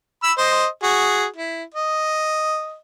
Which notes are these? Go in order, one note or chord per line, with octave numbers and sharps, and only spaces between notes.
B5 E6
C5 D#5
F#4 G#4
E4
D#5